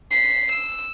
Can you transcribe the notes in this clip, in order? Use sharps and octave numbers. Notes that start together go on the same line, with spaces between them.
B6 C7
E6